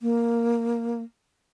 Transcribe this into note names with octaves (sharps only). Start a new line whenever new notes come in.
A#3